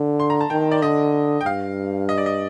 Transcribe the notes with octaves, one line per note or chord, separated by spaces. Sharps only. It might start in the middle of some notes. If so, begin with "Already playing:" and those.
Already playing: D3
C6
A#5
A5
D#3 G5
D5
D3 D#5
G5
G2 F5
D#5
D5
D#5